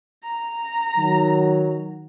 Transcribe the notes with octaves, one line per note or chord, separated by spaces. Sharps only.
A#5
D#3 F#3